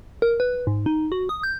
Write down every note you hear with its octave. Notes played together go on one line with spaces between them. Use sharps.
A#4
B4
G#2
D#4
F#4
D#6
G6